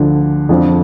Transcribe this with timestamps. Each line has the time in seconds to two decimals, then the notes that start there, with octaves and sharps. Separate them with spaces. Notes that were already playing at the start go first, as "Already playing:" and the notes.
Already playing: D2 D3 F3
0.49 F2 D3 F3